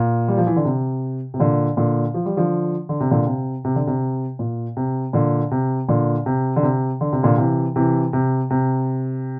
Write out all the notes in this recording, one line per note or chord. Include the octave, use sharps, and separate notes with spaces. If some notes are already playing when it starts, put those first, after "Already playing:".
Already playing: A#2
G3
F3
E3
D3
C3
C3
A#2 D3
A#2 D3
F3
G3
D3 F3
D3
C3
A#2 D3
C3
C3
D3
C3
A#2
C3
A#2 D3
C3
A#2 D3
C3
D3
C3
D3
C3
A#2 D3
C3 E3
C3 E3
C3
C3